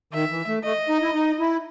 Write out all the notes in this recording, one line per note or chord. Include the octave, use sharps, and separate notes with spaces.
D#3 E5
E3
A3
A3 D#5
D#4
E4
D#4
E4